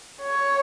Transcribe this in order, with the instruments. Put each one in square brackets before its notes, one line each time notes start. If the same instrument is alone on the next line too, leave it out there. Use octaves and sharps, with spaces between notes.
[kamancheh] C#5